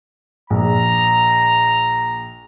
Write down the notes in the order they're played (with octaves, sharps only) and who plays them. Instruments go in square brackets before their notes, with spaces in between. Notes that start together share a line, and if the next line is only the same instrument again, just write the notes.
[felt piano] A#1 [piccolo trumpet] A#5